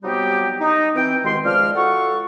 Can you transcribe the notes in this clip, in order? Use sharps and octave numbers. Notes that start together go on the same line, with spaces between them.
C3 F#3 G3 B3 D#4 G4
D#4
E3 C4 G5
C2 B2 D#3 G#3 C6
C#2 F3 G#3 D5 F6
F4 F#4 A4 F#5 C#6